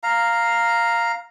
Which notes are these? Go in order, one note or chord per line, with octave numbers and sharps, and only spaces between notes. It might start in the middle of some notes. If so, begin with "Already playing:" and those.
F5 A#5